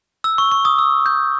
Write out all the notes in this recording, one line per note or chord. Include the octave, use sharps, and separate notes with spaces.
E6
C#6
C#6
D#6
E6
G6